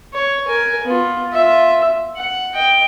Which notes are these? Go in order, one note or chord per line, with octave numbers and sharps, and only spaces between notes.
C#5
A#4 G#5
B3 F4
F4 E5
F#5
D#5 G5